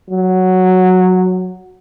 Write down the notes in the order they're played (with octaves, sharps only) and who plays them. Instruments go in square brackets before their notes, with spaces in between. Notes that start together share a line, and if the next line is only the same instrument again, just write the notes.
[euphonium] F#3